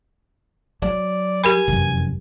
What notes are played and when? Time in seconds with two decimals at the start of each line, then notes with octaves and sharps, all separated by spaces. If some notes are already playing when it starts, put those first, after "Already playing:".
0.82 F#3 D5
1.44 G4 A#4 G#5 B5
1.68 F1 F#2 E3